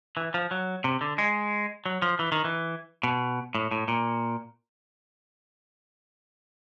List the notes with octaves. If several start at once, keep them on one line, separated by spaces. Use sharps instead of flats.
E3
F3
F#3
C3
D3
G#3
F#3
F3
E3
D#3
E3
B2
A2
A2
A#2